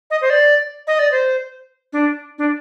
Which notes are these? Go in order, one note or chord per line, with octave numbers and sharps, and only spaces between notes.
D#5
C5
D5
D#5
D5
C5
D4
D4